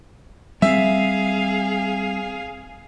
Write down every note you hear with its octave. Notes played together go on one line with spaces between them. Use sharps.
G3 G#3 C4 G#4 E5 F5